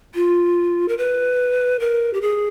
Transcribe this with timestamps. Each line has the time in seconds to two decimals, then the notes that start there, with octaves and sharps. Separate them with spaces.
0.15 F4
0.88 A#4
0.98 B4
1.80 A#4
2.14 G4
2.21 G#4